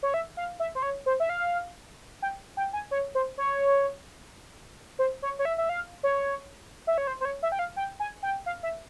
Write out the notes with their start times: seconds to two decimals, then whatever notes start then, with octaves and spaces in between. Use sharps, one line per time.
0.03 C#5
0.14 E5
0.37 F5
0.60 E5
0.75 C5
0.83 C#5
1.06 C5
1.20 E5
1.30 F5
2.22 G5
2.57 G5
2.73 G#5
2.91 C#5
3.15 C5
3.38 C#5
4.99 C5
5.22 C#5
5.39 C#5
5.45 E5
5.58 E5
5.69 F5
6.03 C#5
6.87 E5
6.98 C#5
7.07 C5
7.21 C5
7.25 C#5
7.43 E5
7.52 G5
7.59 F5
7.76 G5
8.00 G#5
8.23 G5
8.46 F5
8.63 E5